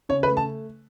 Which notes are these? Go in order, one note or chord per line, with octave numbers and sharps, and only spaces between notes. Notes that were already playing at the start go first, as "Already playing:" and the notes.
C#3 C#5
B4
A3
A5